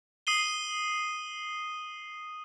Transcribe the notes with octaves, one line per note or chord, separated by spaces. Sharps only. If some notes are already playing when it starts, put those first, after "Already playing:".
D#6 C7 D#7 G7